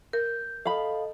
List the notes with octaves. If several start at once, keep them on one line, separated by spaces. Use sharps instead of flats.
A#4 G6
A4 D#5 F5 B5